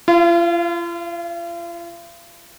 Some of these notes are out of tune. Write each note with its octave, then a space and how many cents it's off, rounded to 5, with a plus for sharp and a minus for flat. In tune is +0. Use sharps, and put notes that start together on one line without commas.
F4 -40 F5 +0